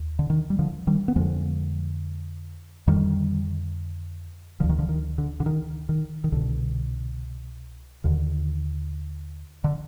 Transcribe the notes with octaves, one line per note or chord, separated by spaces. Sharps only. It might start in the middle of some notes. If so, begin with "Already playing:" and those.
Already playing: D#2
D3
D#3
G3
D3 F3
D#3 G3
B3
F2 D3 F3 G#3
F2 D3 D#3 G3
D2 D3 F3
D#3
D3 F3
D#3
D3
D3
D#3
D#3
D#3
C2 B2 D3
D#2 D3 D#3
D3